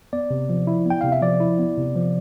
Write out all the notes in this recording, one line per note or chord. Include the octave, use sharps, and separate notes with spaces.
B3 D5
C3
F3
E4
B3 G5
C3 F5
E5
F3 D5
E4
B3
C3
F3